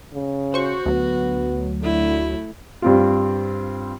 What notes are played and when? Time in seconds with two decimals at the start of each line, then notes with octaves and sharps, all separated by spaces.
0.13 C#3
0.54 F#4 C5 C#6
0.86 D2 F#3 B3
1.82 D3 A3 E4
2.82 G2 C4 F4